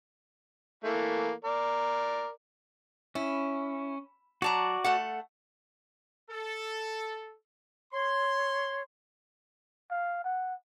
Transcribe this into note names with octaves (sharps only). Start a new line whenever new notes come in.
E3 A3 A#3
A#4 D5
C#4 E4
F#3 F#4 D5 A5 A#5
A3 A4 F#5
A4
C#5 C6
F5
F#5